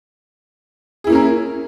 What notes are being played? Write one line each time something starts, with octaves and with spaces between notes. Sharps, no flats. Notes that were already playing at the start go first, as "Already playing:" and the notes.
A#3 C#4 E4 G#4 A#4